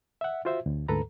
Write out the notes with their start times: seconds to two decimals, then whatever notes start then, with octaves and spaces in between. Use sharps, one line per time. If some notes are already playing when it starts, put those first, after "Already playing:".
0.21 E5 F#5
0.45 F4 F#4 C5 E5
0.66 D2
0.88 D2 G#2 A4 B4 A#5